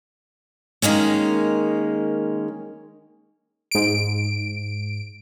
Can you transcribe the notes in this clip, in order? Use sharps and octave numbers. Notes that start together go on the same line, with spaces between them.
D#3 G#3 A#3 C#4
G#2 D7